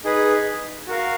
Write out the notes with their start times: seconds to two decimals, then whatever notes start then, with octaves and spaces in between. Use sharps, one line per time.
0.04 D#4 G#4 B4
0.88 F#4 A#4 F5